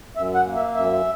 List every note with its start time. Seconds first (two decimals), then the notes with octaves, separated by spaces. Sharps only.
0.16 F#2 E5
0.35 F#5
0.45 A#3
0.55 E5
0.75 F#2 E5